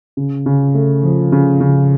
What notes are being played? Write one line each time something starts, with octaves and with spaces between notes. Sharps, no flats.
C#3
C#3
A3
F3
C#3
C#3